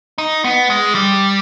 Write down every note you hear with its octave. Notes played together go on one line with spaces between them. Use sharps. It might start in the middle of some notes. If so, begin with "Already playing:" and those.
D#4
B3
G#3
G3